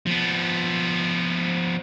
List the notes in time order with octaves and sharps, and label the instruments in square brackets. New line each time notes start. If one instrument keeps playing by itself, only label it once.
[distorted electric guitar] F3 B3